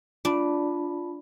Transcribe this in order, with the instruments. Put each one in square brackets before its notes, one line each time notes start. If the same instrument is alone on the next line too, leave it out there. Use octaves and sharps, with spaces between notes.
[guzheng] D4 [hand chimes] F4 A5 B5